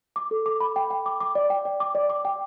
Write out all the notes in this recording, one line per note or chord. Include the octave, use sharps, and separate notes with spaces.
D6
A4
D6
B5
G5
G5
D6
D6
D5
G5
D5
D6
D5
D6
G5